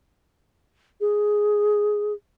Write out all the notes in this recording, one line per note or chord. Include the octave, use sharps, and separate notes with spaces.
G#4